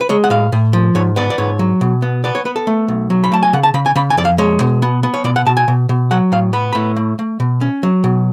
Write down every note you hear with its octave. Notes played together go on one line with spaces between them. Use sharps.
B4
G#3 C#5
F#5
A2 F5
A2
F3
G#2 C#5
B3 D5
D5
G#2 C#5
F#3
B2
B3
B3 D5
C#5
B3 B4
A4
A3
B1
F#3
B5
A3 A5
G#5
C#3 F#5
A5
C#3 B5
G#5
C#3 B5
G#5
F2 D5
F5
G#3 C#5
B2
B3
B3
C#5
B2 D5
F#5
B2 A5
G#5
B2
B2
F#3 F#5
A2 F5
B3 B5
A2 B5
A3
A3
B2
C#4
F#3
B2